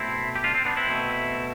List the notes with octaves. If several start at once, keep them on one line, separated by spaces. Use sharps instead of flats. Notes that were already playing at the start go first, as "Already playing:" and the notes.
Already playing: B2 A3 C4 E4
G4
D4 F4
C4
B3 D4
C4 E4
B2 A3